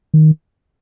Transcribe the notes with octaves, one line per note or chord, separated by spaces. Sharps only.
D#3